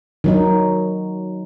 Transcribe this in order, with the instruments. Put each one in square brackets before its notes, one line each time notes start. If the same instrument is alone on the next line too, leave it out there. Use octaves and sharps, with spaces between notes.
[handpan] D#3 F#3 D#4